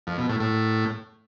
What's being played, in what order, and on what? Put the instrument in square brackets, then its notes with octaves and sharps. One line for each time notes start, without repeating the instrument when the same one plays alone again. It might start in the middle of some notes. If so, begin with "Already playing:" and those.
[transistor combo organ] F2
B2
A2
A2